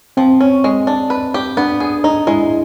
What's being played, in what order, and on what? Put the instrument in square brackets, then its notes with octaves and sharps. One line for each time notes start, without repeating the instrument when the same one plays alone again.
[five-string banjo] F3 [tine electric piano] C4
[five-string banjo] C#4
G#3
D4
B4
G4
[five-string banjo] B3 [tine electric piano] D4
[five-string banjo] G#4
D#4
[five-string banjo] G#3 [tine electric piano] E4